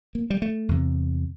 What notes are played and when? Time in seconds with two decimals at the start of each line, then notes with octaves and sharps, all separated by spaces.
0.15 A#3
0.30 G3
0.42 A3
0.69 E2 C3